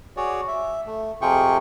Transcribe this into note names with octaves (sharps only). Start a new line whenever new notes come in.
F#4 G#4 C#5 D5
E5
A3
F2 C3 F4 G#4 G5 C#6